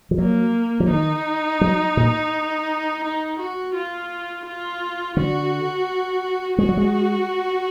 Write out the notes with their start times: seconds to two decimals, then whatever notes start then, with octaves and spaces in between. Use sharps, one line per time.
0.11 F3
0.18 F#3 A#3
0.80 F3
0.90 D#3 D#4
1.61 F#3
1.97 A#2
3.03 D#4
3.39 F#4
3.75 F4
4.46 F4
5.17 D3 F#4
6.58 G#3 F#4
6.69 F#3
6.77 G#3